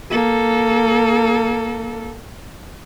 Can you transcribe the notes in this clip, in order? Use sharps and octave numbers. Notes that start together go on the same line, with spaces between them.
A#3 A4